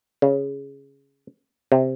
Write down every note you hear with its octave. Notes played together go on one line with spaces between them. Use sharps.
C#3
C3